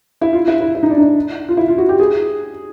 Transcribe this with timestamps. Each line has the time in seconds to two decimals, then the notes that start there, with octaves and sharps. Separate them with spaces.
0.21 E4
0.33 F4
0.48 E4
0.60 E4
0.75 E4
0.83 D#4
0.90 D4
0.98 D#4
1.49 F4
1.57 E4
1.68 F4
1.78 F#4
1.89 G4
2.00 G#4